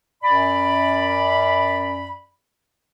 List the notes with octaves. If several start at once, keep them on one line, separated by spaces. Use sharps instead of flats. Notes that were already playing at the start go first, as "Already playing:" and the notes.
F#2 D5 B5